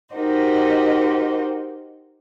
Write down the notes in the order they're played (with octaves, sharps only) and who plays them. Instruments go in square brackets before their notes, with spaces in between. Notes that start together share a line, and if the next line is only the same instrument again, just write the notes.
[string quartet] D#4 F#4 G4 A#4 C5 D#5